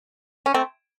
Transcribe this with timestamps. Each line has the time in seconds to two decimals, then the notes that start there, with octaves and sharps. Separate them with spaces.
0.46 C#4
0.54 A3 C4